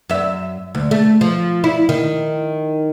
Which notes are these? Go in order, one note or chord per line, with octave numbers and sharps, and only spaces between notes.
F#2 E5
D2
A3
F3
E4
D#3